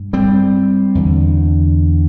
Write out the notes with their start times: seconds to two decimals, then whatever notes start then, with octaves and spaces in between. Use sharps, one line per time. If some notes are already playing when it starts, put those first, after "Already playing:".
Already playing: G2
0.13 G3 C4
0.95 E2 D3